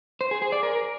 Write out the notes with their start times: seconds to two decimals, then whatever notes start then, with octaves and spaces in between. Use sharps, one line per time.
0.21 C5
0.31 G#4
0.42 G#4
0.52 D5
0.63 A#4